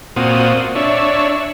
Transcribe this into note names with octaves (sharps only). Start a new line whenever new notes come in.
A#2 C4 F4 F#4 D#6
D4 C#5 E5